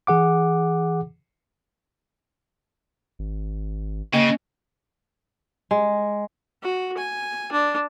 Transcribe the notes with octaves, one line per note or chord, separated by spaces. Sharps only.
E3 G#4 F#5 D6
G#1
C#3 A#3 D#5
G#3
F#4
G#5
D4